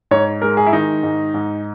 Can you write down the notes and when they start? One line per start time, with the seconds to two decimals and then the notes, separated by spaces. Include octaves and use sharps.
0.11 G#2 C#5
0.42 G#3 A#4
0.57 G#4
0.67 E4
0.73 D#3 D#4
1.03 G#2
1.34 G#2